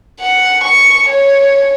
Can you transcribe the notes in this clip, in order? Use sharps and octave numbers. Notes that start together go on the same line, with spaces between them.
F#5
C#6
C#5